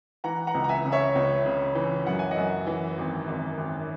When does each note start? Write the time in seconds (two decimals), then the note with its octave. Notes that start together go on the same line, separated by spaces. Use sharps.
0.24 E3 F#5 A#5
0.47 F#5 A#5
0.55 C#2
0.64 A#5
0.69 E5 G#5
0.85 C#3
0.92 C#5 E5
1.15 C#2
1.45 C#3
1.75 E3
2.07 F#2 F#5
2.19 G#5
2.31 D#5 F#5
2.37 F#2
2.67 E3
2.98 G#1
3.27 G#1
3.58 G#1